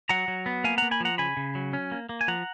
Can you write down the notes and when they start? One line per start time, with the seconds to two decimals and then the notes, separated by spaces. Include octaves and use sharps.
0.09 F#3 F#5 A#5
0.28 F#3
0.46 B3
0.64 A#3 F5 G#5
0.78 A#3 F#5 A#5
0.91 G#5 B5
1.00 F3 F#5 A#5
1.18 C#3 G#5 B5
1.37 C#3
1.55 F#3
1.73 C#4
1.92 A#3
2.09 A#3
2.21 G#5
2.28 F3 F#5 A#5